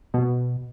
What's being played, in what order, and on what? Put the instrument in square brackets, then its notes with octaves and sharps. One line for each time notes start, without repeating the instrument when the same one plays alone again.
[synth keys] B2